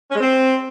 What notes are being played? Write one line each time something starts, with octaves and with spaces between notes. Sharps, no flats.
C#4
G#3
C4